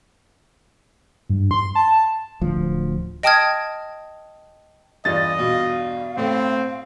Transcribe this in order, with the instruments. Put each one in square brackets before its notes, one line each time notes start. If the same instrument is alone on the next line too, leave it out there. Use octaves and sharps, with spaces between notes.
[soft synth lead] G2
C6
A5
[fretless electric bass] D1 D2 F3
[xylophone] D#5 G5 A5 D#6 F6 G#6
[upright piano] E2 G2 F4 [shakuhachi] D5 [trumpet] D#5 [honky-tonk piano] A6
[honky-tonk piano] B2 [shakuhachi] F5
[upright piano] A2 A3 [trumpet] C4